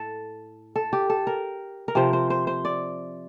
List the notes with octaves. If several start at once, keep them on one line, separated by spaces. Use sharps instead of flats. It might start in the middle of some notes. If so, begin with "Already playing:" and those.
Already playing: A2 A4
A4
G4
A4
A#4
A#4
C3 F3 C5
C5
C5
C5
D5